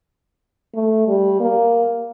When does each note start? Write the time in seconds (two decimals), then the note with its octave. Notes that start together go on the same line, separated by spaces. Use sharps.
0.74 A3
1.08 G3
1.41 A#3